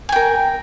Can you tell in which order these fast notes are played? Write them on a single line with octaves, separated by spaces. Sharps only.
G#5 G5 A#4